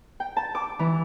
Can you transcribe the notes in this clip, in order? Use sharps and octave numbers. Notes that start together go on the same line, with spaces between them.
G5
A5
D6
E3